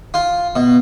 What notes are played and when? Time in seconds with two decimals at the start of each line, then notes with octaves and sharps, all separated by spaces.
0.14 F4
0.56 B2